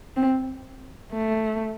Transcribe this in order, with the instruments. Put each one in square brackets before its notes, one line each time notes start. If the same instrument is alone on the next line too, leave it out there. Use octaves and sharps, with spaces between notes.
[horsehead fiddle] C4
A3